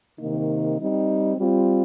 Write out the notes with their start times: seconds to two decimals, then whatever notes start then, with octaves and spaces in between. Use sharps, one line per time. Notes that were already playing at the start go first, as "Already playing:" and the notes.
0.19 C3 D#3 A#3 D#4
0.77 G3 C4 D#4
1.37 G3 C4 F4